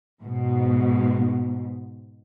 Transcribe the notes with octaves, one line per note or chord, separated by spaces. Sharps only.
G#2 B2